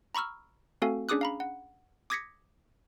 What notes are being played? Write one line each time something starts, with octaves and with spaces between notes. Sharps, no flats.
A#5 B5 C#6 E6 F6
A3 C4 F#4 A4 F5 G#5
C#4 D4 G#4 D6 D#6 F#6
F5 A#5 B5
F#5
D6 D#6 G#6 A#6 B6 C#7